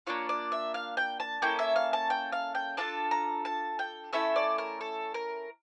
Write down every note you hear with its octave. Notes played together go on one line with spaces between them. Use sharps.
A#3 D4 F4 C#5
D5
E5
F5
G5
A5
A#3 C#4 E4 A4 G5
E5
F5
A5
G5
F5
G5
D4 F4 A4 A5
A#5
A5
G5
A3 C#4 E4 A4 E5
D5
A#4
A4
A#4